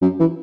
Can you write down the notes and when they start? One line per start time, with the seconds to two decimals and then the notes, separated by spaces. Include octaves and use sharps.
0.02 F#2
0.20 E3